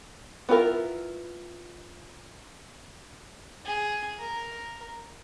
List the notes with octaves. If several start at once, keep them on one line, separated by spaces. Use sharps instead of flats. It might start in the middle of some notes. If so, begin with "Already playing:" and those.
B3 E4 F4 A4 A#4
G#4
A#4